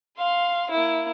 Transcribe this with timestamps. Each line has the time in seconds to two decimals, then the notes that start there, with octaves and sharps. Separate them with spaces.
0.18 F5 C6
0.71 A#3 E4